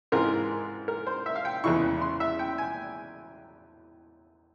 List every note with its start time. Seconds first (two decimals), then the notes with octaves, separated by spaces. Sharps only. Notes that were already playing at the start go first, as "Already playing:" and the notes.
0.12 G#2 E3 G#3 C4 F4 A#4
0.88 A#4
1.07 C5
1.26 E5
1.36 F5
1.45 G5
1.64 E2 C#3 E3 G#3 E4 C#6
2.02 C6
2.20 E5
2.39 G5
2.58 G#5